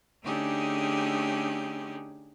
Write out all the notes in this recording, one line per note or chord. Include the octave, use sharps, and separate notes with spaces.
D3 A3 C#4 D#4 G4 G#4